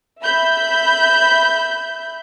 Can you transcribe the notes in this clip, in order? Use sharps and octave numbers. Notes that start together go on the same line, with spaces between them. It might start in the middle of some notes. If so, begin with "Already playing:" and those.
E5 B5 G6